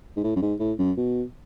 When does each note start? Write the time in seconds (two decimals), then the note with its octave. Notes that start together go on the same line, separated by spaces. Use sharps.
0.16 G#2
0.24 A2
0.36 F#2
0.42 G#2
0.59 A2
0.79 F#2
0.97 B2